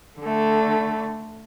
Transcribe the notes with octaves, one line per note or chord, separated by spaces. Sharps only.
D3 A3